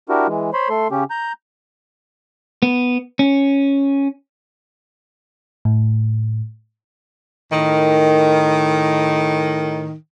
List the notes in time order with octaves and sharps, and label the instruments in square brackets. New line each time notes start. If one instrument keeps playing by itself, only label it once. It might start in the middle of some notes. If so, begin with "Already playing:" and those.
[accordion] D4 E4 F#4 G4 A#4
E3 G#3
C5 C#5 B5 C6
A3 A4 C6
C#3 C#4 G4
A#5 G6
[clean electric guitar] B3
C#4
[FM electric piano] A2
[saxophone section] A2 D#3